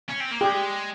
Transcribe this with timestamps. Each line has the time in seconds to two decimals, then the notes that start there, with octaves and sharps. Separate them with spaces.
0.09 C#4
0.20 C4
0.31 A#3
0.41 G#3 G4